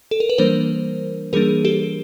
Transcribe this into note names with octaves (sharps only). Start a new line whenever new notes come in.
A4
A#4
B4
E3 G3 A#3 D4 A#4 C5
E3 G3 A#3 D4 G#4 A#4
G4 A4